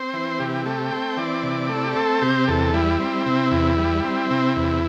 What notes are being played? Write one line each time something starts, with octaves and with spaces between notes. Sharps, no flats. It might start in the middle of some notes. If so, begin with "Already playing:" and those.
Already playing: C4 C5
E3
C3 G4
A3 G4
C4 G5
E3 D5
C3
A3
E4
G4
C4 A4
C3 G4
E2 A4
G3 E4
C4
C3
E2
G3
C4
C3
E2